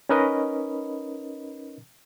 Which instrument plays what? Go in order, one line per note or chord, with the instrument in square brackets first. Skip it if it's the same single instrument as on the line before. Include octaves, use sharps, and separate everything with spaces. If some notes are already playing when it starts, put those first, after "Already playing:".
[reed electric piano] C#4 D#4 A#4 B4 D#5 B5